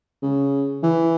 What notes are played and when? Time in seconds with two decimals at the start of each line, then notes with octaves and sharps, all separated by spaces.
0.22 C#3
0.83 E3